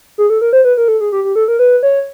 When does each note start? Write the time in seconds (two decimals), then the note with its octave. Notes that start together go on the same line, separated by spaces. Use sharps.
0.18 G#4
0.30 A4
0.41 A#4
0.53 C5
0.65 B4
0.77 A#4
0.88 A4
1.01 G#4
1.12 G4
1.24 G4
1.36 A4
1.48 A#4
1.59 B4
1.83 C#5